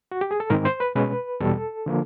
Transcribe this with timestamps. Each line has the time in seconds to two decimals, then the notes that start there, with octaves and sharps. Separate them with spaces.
0.12 F#4
0.21 G4
0.31 G#4
0.40 A4
0.50 G#2 D#3 G#3 C4 A#4
0.65 C5
0.80 B4
0.95 B2 G#3 C#4 B4
1.40 E2 B2 G3 A4
1.86 D3 F3 A#3